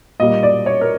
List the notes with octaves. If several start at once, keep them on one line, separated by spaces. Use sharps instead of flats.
A#2 G3 A#3 D#5
D5
C#5
A#4